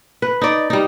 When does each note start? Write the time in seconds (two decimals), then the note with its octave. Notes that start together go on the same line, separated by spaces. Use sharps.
0.22 B4
0.42 D#4 D5
0.70 G3 D#4